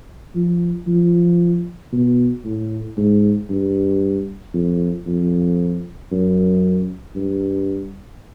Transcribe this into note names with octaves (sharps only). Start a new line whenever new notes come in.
F3
F3
B2
A2
G#2
G2
F2
F2
F#2
G2